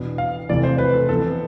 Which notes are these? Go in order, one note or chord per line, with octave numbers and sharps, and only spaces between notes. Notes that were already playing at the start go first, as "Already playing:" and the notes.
Already playing: E2 B2 B3 D4
F5
F1 E2 C3 E3 A3 D5
C5
B4
A4
F2 E3 B3 A4